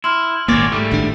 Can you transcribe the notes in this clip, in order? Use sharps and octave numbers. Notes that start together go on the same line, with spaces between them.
E4 C6 F6
G#1 A#2 A#3 C#5 D5
G#2 G3 A3
G#1 A2 D4